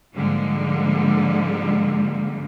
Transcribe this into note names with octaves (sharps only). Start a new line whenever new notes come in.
G#2 D3 F3 G3 G#3 A#3